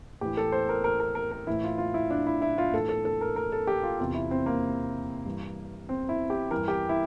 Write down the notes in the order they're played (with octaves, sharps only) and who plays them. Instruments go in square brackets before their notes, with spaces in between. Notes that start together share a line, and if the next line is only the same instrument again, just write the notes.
[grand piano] A2 E3 G4
A4
C5
A#4
A#4
A#4
A#4
A#4
A2 E3 E4
F4
F4
E4
D4
E4
E4
F4
A2 E3 A4
A4
A4
A#4
A#4
A4
G4
F4
E2 C3 E3 F4
E4
C4
A#3
G2 E3
C4
E4
G4
E3 A#4
G2
G4
E4